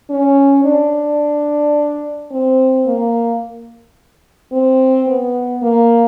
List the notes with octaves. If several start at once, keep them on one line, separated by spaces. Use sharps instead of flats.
C#4
D4
C4
A#3
C4
B3
A#3